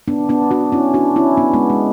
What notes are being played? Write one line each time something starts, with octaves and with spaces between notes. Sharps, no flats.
B3 D4
B3 D4
D4 F#4
C#4 E4
D4 F#4
C#4 E4
B3 D4
G#3 B3
G#3